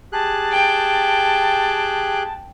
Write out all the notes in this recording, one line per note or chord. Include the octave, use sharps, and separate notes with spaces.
G4 G#4 A5 F#6
G5